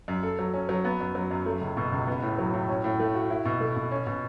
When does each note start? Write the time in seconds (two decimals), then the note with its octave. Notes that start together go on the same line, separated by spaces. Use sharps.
0.08 F#2
0.23 A4
0.39 F#3
0.54 C#4
0.69 F#3
0.85 B3
1.00 F#2
1.15 F#3
1.31 F#2
1.46 A3
1.61 C#2
1.77 B2
1.92 C#2
2.07 B3
2.22 A2
2.39 F#3
2.53 A2
2.69 C#4
2.84 A2
2.99 A3
3.15 F#4
3.30 E4
3.45 B2
3.60 A3
3.76 B2
3.91 C#4
4.07 B2